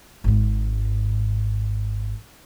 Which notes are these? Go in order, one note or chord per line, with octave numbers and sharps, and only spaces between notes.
G#1 G#2